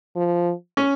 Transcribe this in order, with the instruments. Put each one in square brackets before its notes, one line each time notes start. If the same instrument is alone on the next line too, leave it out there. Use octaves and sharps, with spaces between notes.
[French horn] F3
[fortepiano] C#4